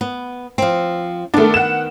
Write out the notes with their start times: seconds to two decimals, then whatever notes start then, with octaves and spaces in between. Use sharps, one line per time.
0.01 B3
0.58 F3 C4
1.34 D#3 A3 B3 D4
1.54 F#5 E7